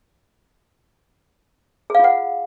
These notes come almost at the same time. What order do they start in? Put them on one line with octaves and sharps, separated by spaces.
G#4 F5 F4 F#5